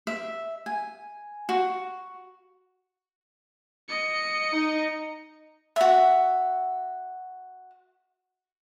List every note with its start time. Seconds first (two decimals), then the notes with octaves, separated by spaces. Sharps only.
0.07 E5
0.66 G#5
1.49 F#4
3.89 D#5 C#7
4.53 D#4
5.76 F#4 E5